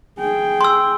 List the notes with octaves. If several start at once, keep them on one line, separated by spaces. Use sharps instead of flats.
G#4 G5
C6 E6